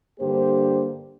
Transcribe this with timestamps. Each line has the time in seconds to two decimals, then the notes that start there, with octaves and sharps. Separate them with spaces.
0.20 G2 D3 A#3 G4 C5